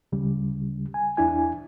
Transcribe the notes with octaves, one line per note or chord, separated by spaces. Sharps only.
D2 C#3 G3
G#5
E2 D4 E4 G#5